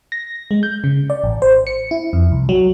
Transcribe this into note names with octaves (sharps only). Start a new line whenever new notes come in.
A#6
G#3
G6
C#3
D5
A1
C5
C#7
E4
F2
C2
F#3